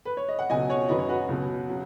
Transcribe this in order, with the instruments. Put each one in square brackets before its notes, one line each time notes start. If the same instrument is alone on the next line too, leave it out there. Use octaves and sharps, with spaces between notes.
[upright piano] B4
C#5
D#5
F#5
C#2 B2 F#3 D#5 G#5
C#5 F#5
F#2 D#3 F#3 B4 D#5
C#5
F#4 B4
C#2 B2 F#3
C#3 F#3